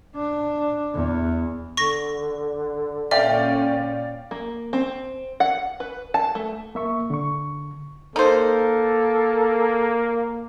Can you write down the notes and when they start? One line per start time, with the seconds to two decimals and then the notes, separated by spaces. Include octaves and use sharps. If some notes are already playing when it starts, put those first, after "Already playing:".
0.16 D4
0.94 E2
1.77 D3 C#6 A#6
3.11 A#2 C#4 D5 E5 F5 G5
4.31 A#3
4.73 C4
5.40 F#5
5.80 B4
6.14 A5
6.35 A3
6.75 A#3 E5 C#6
7.10 D3 C#6
8.16 A#3 D#4 A4 C5